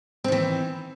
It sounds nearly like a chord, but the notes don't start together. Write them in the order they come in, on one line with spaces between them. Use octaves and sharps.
C4 D#3 E3